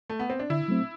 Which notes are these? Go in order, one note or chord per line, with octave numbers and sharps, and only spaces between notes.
A3
B3
C4
D4
D3 E4
F#3 A3 C4